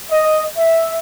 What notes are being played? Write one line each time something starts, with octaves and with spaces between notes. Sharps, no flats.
D#5
E5